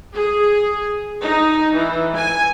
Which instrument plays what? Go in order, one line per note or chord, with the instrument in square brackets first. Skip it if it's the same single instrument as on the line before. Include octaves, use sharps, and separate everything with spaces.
[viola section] G#4
D#4
E3
G#5